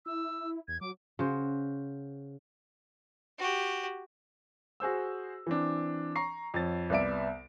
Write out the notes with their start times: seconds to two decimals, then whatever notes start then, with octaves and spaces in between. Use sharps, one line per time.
0.06 E4 E6
0.68 E2 G#6
0.81 F#3 D6
1.19 C#3 F#4 C5
3.38 F#4 G4
4.80 F#4 G#4 C5 E6
5.47 E3 C4 D4
6.16 A#5 C#6 C7
6.54 F2 C#5 A6
6.90 C2 B3 D5 E5 D7